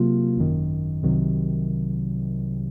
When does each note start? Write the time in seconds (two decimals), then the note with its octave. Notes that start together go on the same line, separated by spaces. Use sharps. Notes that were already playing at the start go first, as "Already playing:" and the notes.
Already playing: C3 F#3 A#3 F4
0.37 G#1 F#2 D#3
1.03 C2 C3 D#3 F#3